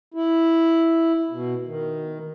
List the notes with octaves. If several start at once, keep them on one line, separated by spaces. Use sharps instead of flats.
E4
B2
D#3